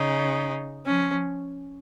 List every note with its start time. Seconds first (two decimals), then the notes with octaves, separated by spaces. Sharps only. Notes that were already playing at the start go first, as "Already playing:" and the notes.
Already playing: C#3 D#4
0.86 F3 C#4